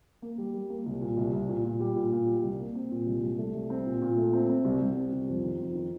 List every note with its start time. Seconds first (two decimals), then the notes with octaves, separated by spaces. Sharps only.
0.22 A#3
0.38 G3
0.54 G3
0.70 A#3
0.86 C2
1.01 A#2
1.17 C2
1.33 C2
1.49 A#2
1.65 A#2
1.80 G3
1.96 A#2
2.12 A#2
2.27 G3
2.43 C2
2.60 A#3
2.75 C4
2.91 A#2
3.07 C2
3.23 C2
3.38 A3
3.54 C2
3.70 C4
3.86 A#2
4.02 A#2
4.17 A3
4.33 C4
4.49 C4
4.65 C2
4.80 C2
4.96 C4
5.12 C2
5.28 F2
5.44 D#3
5.60 F2
5.75 D#3